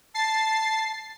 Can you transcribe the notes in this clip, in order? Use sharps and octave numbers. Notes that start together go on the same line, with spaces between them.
A5 A6 C7